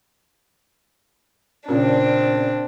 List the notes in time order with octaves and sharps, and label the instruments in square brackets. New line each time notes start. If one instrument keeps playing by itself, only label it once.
[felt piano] A#2 C#3 [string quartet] C4 D4